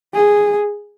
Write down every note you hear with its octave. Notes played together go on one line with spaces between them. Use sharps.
G#4